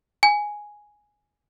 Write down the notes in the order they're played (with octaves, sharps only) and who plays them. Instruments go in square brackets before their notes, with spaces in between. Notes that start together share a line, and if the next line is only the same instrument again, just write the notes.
[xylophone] G#5